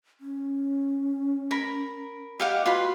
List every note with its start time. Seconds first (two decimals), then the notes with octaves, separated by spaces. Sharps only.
0.21 C#4
1.51 A#4 B5
2.40 G4 D#5 F5 F#5
2.66 F4 F#4 B4 C6